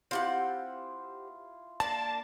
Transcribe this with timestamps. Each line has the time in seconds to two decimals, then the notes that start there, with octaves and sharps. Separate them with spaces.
0.11 C4 E4 F4 G4 F#5
1.80 A#3 D4 A5